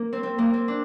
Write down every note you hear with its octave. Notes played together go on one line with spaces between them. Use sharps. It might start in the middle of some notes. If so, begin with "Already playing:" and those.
Already playing: A#3
C4
C4
A#3
C4
D4